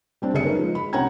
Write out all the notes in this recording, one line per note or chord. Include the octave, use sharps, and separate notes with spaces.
G3 C4 D4
F#1 D2 G#4 E5 C#7
C#4 D#4 A#4 B4
F3 G#3
B5
C2 C#4 F#5 G5 A#5 G#6